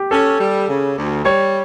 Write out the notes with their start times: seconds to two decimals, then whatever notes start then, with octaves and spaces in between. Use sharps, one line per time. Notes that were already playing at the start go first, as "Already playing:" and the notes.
Already playing: G4
0.11 C#4 A4
0.39 G3
0.68 C#3
0.97 D2
1.24 G3 C#5